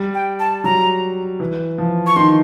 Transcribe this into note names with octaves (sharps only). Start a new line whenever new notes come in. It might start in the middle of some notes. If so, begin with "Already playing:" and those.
Already playing: G3
G5
A5
F#3 A#5
E3
F3
C#6
D#3 C6